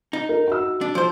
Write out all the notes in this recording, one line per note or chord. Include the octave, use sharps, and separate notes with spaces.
D#4
A#4
F#4 E6
D4
F3 C5